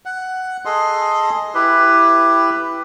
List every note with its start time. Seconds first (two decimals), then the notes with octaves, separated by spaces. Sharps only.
0.05 F#5
0.65 G#4 A4 D#5 C6
1.55 E4 G4 B4